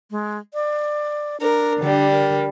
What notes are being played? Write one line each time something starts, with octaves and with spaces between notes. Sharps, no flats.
G#3
D5
D4 A#4
D3 G3
A#4